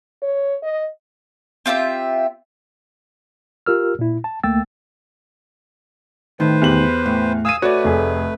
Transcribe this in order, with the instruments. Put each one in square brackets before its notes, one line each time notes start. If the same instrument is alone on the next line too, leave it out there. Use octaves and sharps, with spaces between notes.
[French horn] C#5
D#5
[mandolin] C4 F4 G4 E5
[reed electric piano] F4 G4 A#4 E6 F6
A#2 E4
A5
D2 A3 A#3 G5 E6 A6
[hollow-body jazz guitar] A2 D#3 [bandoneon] B4 C5
[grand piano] E2 G4 F#7
[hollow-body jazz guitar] A2
[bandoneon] F5 G#5 E6 [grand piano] D#6 D#7
[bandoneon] A3 B4 [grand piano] F#4 [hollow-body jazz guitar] C#5 D5
[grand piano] F1 G#4